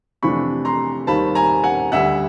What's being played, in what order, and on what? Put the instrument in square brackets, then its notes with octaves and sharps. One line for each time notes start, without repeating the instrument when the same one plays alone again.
[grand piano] F2 C3 E3 A3 D4 B5 C#6
A#5 C6
D#2 D#3 G3 C4 A5 B5
G#5 A#5
F#5 G#5
D2 D3 G3 E5 F#5